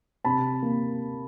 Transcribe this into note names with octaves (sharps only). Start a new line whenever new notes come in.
C3 A5 B5
A#3